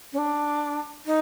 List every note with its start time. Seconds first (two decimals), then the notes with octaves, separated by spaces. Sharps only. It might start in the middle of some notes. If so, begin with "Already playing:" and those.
0.13 C#4
0.18 D4
1.06 D#4